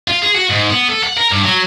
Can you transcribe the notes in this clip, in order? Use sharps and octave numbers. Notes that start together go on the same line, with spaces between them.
F4
G#4
F#4
G#2
B3
A4
F#5
A#4
G2
F#3